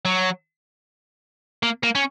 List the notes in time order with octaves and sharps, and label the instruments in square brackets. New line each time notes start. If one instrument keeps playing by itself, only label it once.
[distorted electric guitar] F#3
A#3
A#3
C#4